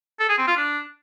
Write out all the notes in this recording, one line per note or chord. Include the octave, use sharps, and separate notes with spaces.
A4
G#4
C4
F4
D4